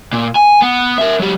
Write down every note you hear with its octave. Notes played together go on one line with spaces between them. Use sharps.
A#2
G#5
B3
A#4 E5
F#3 G4